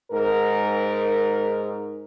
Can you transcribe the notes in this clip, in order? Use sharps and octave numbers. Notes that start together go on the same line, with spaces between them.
G#2 A#4